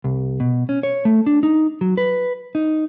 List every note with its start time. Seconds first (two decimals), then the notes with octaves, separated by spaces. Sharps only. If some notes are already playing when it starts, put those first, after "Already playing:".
0.04 C2
0.40 B2
0.69 C#4
0.83 C#5
1.05 A3
1.27 D4
1.43 D#4
1.81 F#3
1.97 B4
2.55 D#4